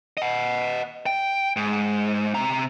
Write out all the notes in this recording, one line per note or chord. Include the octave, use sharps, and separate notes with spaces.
D#5 F#5
G5
G#2
C3 A#5